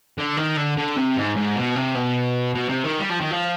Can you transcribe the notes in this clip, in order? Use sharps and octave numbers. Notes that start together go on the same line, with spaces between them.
D3
D#3
D3
D3
C3
G#2
G#2
B2
C3
B2
B2
C3
D#3
G3
F3
D#3
F3